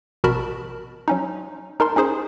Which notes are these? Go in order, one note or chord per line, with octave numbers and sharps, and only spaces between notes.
A1 B2 F#4 A#4 A5 B5
F#3 C#4 D#4
D#4 A#4 A5 C6
C#4 D#4 G#4 C5 C6